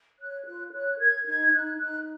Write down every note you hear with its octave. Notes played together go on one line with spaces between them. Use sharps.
C#5 F#6
F4 F#6
C#5 F#6
A#4 G#6
D#4 G#6
G#6
D#4 F#6
D#4 F#6